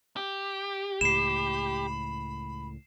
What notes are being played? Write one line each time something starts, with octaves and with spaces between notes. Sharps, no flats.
G4
C#2 A2 B5 C7 E7